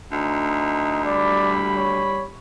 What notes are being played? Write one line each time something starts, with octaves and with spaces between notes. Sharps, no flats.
D2 D#4
G3 D5 B5
C#5